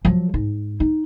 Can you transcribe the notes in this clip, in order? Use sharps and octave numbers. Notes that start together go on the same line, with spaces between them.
F3 F#3
G#2
D#4